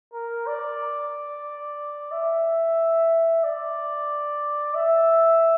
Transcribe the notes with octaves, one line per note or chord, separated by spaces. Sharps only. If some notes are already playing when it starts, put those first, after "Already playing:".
A#4
D5
E5
D5
E5